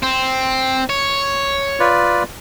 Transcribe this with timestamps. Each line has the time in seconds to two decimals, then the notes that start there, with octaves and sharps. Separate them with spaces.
0.03 C4
0.90 C#5
1.80 F4 B4 D5